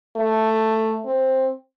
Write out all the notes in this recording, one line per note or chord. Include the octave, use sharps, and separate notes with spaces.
A3
C4